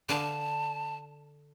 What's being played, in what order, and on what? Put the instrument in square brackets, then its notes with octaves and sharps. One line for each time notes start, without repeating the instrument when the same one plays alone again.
[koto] D3 F5 [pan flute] A5